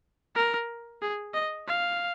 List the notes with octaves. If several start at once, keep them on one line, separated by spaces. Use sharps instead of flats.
A#4
G#4
D#5
F5